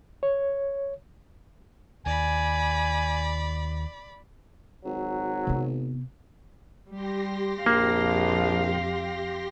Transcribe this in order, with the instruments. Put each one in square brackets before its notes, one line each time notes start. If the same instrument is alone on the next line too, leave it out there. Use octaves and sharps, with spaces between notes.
[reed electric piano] C#5
[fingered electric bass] D#2 [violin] D5 B5 [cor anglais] G#5
[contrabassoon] G#1 [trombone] F#3
[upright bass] C3 B3
[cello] G3 [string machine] G4 C6 A#6
[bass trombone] A#1 [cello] F2 F5 [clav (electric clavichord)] A#3